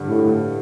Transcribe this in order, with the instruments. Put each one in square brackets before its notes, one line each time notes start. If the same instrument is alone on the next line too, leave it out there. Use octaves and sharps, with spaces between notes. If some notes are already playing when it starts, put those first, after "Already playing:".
Already playing: [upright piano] G2 D3 G3
[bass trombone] A2